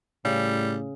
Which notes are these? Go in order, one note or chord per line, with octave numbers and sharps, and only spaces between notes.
A2 C#3 G3